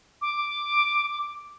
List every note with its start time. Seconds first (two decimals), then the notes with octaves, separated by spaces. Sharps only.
0.21 D6